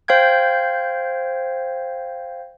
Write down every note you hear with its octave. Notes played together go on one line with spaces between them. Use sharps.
C5 F5 G5 G6 G#6